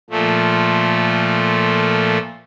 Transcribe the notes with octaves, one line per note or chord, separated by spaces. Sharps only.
A#2 F3 A3